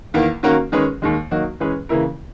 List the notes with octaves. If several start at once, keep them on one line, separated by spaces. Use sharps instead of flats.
E2 D#3 A#3
D#3 A#3 C#4 F#4 A#4
D#3 G#3 C#4 G#4 B4
D#2 D#3 G#3
D#3 F#3 A#3 D#4 F#4
E3 G#3 C#4 G#4 B4
C#3 E3 A#3 E4 A#4